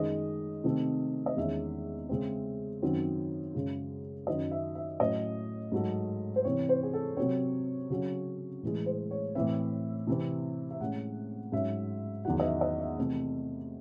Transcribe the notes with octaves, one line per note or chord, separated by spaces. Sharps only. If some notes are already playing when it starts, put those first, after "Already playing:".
Already playing: F#2 D#3 G#3 D#5
C3 D#3 A3 C4
D#5
E2 D#3 G#3 C#4 E5
C#3 G#3 C4
F#2 D#3 F#3 C4
F#2 C#3 G#3
F#2 D#3 F#3 D#5
E5
E5
A2 F#3 C#4 D#5
G#2 F#3 A3
C5
C3 E3 C4 C#5
C5
G#4
A4
C3 F#3 C4 C#5
C#3 F#3 C#4
A2 E3 G#3
C5
C#5
A2 E3 C4 E5
C3 E3 C4
E5
A2 G#3 C#4 F#5
G#2 F#3 C#4 E5
E2 D#3 F#3 F#5
D#5
E5
D#5
E5
C3 E3 A3 C4